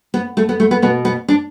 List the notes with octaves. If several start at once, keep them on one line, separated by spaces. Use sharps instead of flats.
B3
A3
B3
A3
B3
B2 B3
B3
D4